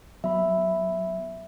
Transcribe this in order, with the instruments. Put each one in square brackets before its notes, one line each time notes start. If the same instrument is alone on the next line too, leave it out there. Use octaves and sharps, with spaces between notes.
[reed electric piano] F#3 B3 B5 [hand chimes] E5